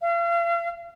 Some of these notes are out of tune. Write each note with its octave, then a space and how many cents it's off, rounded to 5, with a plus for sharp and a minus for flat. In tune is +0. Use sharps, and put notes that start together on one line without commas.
F5 -40